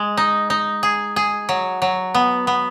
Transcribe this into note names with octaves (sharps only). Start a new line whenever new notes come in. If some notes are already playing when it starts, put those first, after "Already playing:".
Already playing: G#3
D#4
D#4
G#4
G#4
F#3
F#3
B3
B3